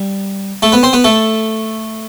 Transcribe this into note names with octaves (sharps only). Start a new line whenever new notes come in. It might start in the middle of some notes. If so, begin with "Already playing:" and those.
Already playing: G3
A3 A4
B3 B4
C4 C5
B3 B4
A3 A4